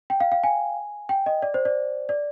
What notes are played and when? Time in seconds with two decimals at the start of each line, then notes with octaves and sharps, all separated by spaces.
0.10 G5
0.20 F5
0.32 F5
0.43 G#5
1.09 G5
1.26 D#5
1.42 D5
1.54 C5
1.65 D5
2.09 D5